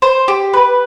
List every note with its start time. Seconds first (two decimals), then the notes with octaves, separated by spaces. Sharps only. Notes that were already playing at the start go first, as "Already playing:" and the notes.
0.02 C5
0.28 G4
0.53 B4